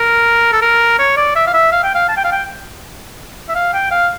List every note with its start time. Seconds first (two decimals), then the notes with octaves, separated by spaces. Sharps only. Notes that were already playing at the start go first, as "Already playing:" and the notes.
Already playing: A#4
0.52 A4
0.62 A#4
0.99 C#5
1.17 D5
1.35 E5
1.47 F5
1.54 E5
1.72 F5
1.83 G5
1.95 F5
2.09 A5
2.17 G5
2.24 F5
2.32 G5
3.49 E5
3.55 F5
3.73 G5
3.91 F5